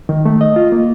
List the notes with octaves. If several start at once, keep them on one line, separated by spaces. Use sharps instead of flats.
D#3
A3
D#5
F4
A#3